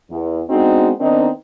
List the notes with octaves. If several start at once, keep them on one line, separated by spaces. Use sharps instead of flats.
E2
G#3 B3 C4 D4 D#4 F#4
D#3 B3 C4 D4 D#4